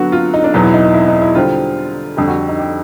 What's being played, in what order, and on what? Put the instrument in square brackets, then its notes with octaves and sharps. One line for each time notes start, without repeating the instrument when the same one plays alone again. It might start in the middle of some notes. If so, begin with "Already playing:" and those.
Already playing: [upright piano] D3 F#3 B3 F#4
F4
D#4
D4
E2 B2 F#3 B3 D#4
E4
D#4
D#4
E4
D#4
E4
D3 G3 C4 F4
F2 D3 G3 G4
F#4
D#4
G4